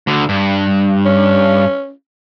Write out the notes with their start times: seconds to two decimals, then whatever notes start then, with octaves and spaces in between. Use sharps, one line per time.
0.07 D2 D3
0.29 G2
1.06 C#4